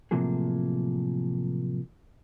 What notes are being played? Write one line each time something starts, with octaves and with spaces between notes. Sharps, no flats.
A2 C3 F3 F#3 A#3 G#4